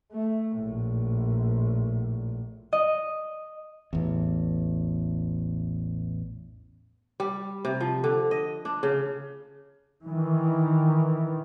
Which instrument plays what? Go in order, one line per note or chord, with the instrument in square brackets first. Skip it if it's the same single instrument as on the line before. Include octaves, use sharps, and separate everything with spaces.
[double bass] A3
A#1 A2
[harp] D#5
[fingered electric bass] A1 E2
[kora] G3
C3
F3
D3
D#5
D4
C#3
[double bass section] D#3 E3